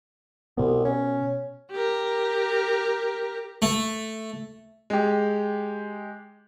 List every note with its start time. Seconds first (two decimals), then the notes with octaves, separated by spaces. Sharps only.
0.57 C2 B2 B3
0.85 C#4
1.71 G4 A#4
3.62 A3
4.90 G#3 G4